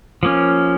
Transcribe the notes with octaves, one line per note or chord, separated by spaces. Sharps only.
F3 A#3 C#4